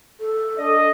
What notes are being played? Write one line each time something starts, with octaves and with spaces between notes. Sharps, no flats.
A4
D4 D#5